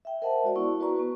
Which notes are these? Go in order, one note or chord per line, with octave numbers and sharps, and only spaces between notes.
E5 G5
A#4 C5 D#5 E5 F#5 A5
G#3 F#4 D5
B3 E4 D5 C#6
F#4 B4 D5 A#5 C#6
B3 B4